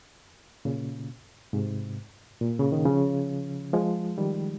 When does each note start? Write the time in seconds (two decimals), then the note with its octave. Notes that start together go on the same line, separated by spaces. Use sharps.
0.65 A#2 C#3
1.53 G#2 C3
2.41 A#2
2.59 C#3
2.72 D#3
2.85 C#3 F3
3.73 F3 G#3
4.18 D#3 G3